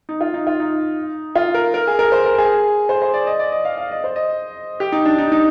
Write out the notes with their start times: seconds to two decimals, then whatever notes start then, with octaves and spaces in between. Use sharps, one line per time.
0.09 D#4
0.21 F4
0.34 D#4
0.47 F4
0.60 D#4
1.36 F4
1.54 A#4
1.74 A#4
1.87 G#4
1.99 A#4
2.12 C5
2.26 A#4
2.38 G#4
2.89 C5
3.02 C5
3.14 D5
3.27 D#5
3.40 D5
3.52 D#5
3.65 F5
3.77 F5
3.91 D#5
4.04 C5
4.16 D#5
4.80 G4
4.92 D#4
5.05 D4
5.18 D#4
5.32 D#4